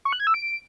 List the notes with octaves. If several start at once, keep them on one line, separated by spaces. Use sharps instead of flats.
C#6
F#6
G#6
E6
D7